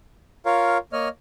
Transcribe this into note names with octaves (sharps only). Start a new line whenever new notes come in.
F4 A#4 C#5 F5
A#3 C#5 D#5 F6